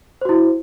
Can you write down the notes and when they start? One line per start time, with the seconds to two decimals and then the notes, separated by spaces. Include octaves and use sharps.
0.21 C5
0.25 F#4
0.29 E4